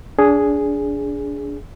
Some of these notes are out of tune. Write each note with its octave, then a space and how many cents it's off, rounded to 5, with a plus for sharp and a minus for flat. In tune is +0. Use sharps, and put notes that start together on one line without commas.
D4 -25 G#4 +0